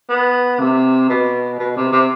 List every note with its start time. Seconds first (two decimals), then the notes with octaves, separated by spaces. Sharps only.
0.09 B3
0.60 C3
1.10 B2
1.59 B2
1.76 C3
1.93 C3